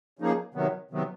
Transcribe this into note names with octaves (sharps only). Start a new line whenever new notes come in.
C#3 F3 A#3 D#4 G#4
C3 D#3 F#3 B3
C3 D#3 F#3 B3